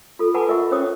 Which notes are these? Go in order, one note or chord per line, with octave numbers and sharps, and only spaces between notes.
F4 A4
B4 F#5 G#5 A5 B5 D6
F4 A#4 D#5 E5 C#6
C#4 C5 C#5 G5 D6 D#6